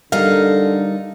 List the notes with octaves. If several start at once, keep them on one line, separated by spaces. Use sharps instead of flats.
D3 G3 D#4 A4 A#4 F5